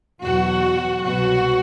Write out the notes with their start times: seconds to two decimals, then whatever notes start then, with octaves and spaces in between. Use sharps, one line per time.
0.23 E2 B2 F#3 F#4
1.04 C2 B2 F#3 F#4